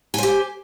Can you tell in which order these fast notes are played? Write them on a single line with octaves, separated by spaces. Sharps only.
G#5 C5 G4